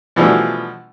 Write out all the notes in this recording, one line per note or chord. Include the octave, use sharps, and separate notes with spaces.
B2 E3 F3 G3 A3